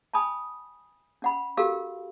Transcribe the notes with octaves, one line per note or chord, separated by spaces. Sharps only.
G#5 A5 B5 D#6
C#4 F#5 B5
F#4 G4 A4 A#4 F5